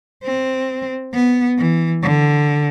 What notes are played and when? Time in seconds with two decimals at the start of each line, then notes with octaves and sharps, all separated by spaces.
0.23 C4
1.13 B3
1.58 E3
2.03 D3